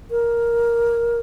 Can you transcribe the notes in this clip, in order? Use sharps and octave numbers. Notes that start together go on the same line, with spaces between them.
A#4